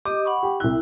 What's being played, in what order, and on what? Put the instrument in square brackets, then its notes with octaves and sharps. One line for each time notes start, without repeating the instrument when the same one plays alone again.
[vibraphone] G4 D#5 D#6 [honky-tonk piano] D6
[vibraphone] F#5 B5 C#6
[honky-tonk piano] G4
[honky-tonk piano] C2 F#6 [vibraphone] E4